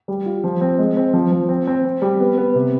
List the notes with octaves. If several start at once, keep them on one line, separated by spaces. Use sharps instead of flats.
G3
F4
F3
C4
G#3
C4
F3
F3
C4
C4
C4
G3
B3
B3
C3